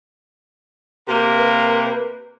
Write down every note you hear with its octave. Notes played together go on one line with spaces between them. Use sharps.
C3 A#3 G4
B4